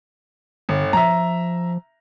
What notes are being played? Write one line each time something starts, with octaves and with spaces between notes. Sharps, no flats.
G1 D3
F3 E5 A#5